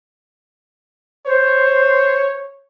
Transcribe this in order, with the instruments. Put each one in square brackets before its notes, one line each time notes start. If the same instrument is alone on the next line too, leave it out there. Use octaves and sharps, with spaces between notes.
[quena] C5 [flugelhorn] C#5